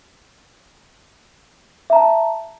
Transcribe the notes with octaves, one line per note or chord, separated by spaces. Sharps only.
E5 A5 A#5